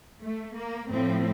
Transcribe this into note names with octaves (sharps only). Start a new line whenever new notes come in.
A3
A#3
A2 F3 C4